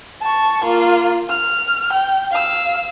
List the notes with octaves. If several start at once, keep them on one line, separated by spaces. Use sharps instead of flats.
A5 C#6
A#3 F4
F6
G5
F5 E6